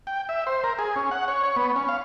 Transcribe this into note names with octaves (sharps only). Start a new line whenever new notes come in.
G5
E5
C5
A#4
G#4
C#4
F#5
C#5
C#5
B3
C#4
F5